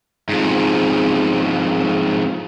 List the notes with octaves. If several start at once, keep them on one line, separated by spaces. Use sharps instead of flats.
F2 G#2